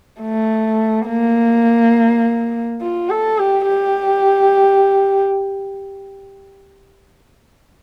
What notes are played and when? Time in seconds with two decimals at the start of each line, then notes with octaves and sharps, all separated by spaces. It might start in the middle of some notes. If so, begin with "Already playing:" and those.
0.21 A3
1.07 A#3
2.81 F4
3.09 A4
3.39 G4
3.67 G4